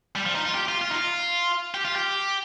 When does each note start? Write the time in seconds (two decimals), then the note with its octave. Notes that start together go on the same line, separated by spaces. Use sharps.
0.15 G3
0.25 F3
0.35 D#4
0.45 F4
0.55 G4
0.68 F4
0.81 F4
0.90 D#4
0.95 F4
1.74 G4
1.85 F4
1.96 G4